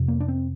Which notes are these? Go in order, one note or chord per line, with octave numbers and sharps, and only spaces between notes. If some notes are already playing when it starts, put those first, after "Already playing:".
Already playing: F2 C3
A#3
D4
C4